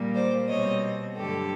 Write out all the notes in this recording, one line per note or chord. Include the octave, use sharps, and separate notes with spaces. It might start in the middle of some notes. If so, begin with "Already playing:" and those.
Already playing: A#2 G3 A#3
C5 D5
B2 G3 C4 C#5 D#5
G2 D3 F#3 A3 G4 A4